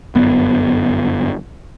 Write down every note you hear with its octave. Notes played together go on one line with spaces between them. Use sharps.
G1 F#2 B3